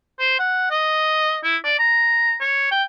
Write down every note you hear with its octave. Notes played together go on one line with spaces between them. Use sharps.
C5
F#5
D#5
E4
D5
A#5
C#5
G5